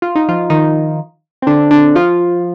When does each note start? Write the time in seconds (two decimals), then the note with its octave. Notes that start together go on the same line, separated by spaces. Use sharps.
0.02 F4
0.15 D#4
0.28 F3 F4
0.50 D#3 D#4
1.42 C4
1.47 D3 D4
1.71 D3 D4
1.95 F3 F4